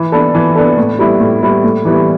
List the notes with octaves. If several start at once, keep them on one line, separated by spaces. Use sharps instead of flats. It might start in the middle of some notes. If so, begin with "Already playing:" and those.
Already playing: E3
B3 D4 A4
E3
B3 D4 A4
A2
G3 B3 E4
A2
G3 B3 E4
A2
E3 G3 B3 E4